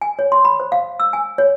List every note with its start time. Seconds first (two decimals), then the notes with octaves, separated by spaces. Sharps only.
0.02 G#5
0.19 C#5
0.32 C6
0.45 B5
0.60 C5
0.72 F5
1.00 E6
1.13 G#5
1.38 C#5